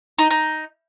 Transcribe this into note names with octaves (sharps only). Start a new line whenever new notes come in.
D#4
D#4